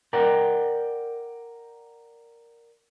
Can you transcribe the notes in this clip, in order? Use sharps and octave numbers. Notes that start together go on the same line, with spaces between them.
A#4 D5 F#5 G5